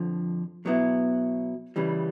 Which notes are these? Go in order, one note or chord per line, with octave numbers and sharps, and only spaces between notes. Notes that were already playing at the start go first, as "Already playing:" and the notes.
Already playing: F2 D3 F3
B2 F#3 B3 E4
C#3 E3 G3